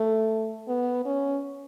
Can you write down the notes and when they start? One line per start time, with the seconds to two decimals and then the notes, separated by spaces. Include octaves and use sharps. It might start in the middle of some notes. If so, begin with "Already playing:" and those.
Already playing: A3
0.68 B3
1.05 C#4